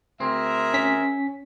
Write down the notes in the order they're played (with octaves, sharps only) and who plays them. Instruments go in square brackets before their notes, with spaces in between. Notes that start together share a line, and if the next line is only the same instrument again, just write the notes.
[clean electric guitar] D2 C4 [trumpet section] G#4 A#4 E5
[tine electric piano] C#4 B6